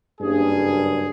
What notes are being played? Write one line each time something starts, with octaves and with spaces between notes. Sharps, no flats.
F#1 G2 G#4